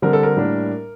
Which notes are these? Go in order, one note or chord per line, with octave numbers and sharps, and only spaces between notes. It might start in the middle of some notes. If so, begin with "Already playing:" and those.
D3 G3 C4 A#4
A4
A#4
A2 G3 A#3 D4